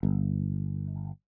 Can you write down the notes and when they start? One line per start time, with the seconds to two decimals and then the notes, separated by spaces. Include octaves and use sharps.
0.03 G1